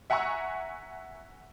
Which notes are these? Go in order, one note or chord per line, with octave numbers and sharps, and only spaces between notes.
E5 F#5 G#5 A#5 C#6 E6